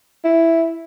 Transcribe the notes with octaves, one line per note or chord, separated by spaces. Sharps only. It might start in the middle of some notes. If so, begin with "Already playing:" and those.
E4